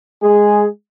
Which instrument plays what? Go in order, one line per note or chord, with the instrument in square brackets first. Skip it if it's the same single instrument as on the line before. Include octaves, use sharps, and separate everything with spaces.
[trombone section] G#3 G#4